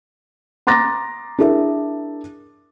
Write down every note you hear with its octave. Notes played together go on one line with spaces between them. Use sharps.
A#5 C6 D6 A6 A#6
D4 E4 G#4 A#4 E5